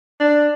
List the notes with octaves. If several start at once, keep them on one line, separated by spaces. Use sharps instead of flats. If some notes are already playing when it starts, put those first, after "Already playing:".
D4